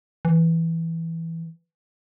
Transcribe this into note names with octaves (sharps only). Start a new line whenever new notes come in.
E3